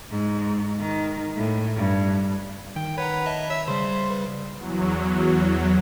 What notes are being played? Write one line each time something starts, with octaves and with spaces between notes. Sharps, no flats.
G#2
D#3
A2
G2
D#3 G5
B4 C#5 F#5 A#5
D#5 E5 A5
C#5 E5
C#3 G3 C5
B4
E2 F#3